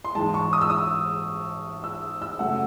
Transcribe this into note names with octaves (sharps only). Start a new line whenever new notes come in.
C6
G#2 E3 G#3 A5
C#6
D#6
E6
D#6
E6
E6
F#2 C#3 F#3 A3 F#5